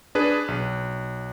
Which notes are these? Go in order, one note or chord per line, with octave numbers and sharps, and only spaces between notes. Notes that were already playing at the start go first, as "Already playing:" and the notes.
D4 G#4 B4
B1